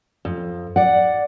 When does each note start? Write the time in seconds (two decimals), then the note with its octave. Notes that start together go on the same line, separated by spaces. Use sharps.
0.25 F2
0.76 D5 F#5